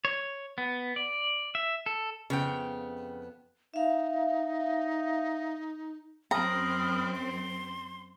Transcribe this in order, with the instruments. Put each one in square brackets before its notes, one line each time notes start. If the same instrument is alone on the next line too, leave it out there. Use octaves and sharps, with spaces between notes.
[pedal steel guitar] C#5
B3
D5
E5
A4
[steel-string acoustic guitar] F2 B3 G5 [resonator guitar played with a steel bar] C#3
[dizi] D#4 [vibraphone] E5 F5
[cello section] F#2 C4 [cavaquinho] A#5 [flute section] B5 D#6 F6
[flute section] C6